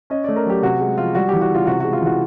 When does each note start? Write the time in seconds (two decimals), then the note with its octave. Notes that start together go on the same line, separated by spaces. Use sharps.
0.10 C#4 D#5
0.24 A3 D5
0.36 A#4
0.46 F#3 G4
0.62 C3 F#4
0.80 G#3
0.98 F3 F4
1.15 G3 F#4
1.29 E3 G4
1.41 F#4
1.50 C#3 F4
1.67 C3 F#4
1.80 G#3 F#4
1.93 F4
2.01 E3 F#4